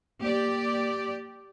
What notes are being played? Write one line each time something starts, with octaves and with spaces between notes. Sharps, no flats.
A#3 G4 D5